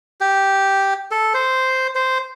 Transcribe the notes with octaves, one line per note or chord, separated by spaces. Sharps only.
G4
A4
C5
C5